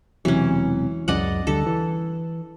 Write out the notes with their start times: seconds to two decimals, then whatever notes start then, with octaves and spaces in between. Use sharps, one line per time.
0.25 E1 C3 E3 F#3 C#4
1.08 C#2 F#2 C#3 D5 D#5 F#5
1.47 D2 D3 G3 A4
1.66 E3